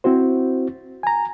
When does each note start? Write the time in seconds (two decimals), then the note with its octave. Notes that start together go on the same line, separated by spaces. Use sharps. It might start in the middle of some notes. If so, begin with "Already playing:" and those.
0.04 C4 E4 F#4 C5
1.03 G#5 A#5